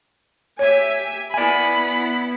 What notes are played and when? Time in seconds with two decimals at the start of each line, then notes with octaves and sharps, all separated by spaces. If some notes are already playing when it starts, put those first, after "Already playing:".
0.59 G4 C#5 E5 G#5
1.34 B3 E4 D5 G#5 B5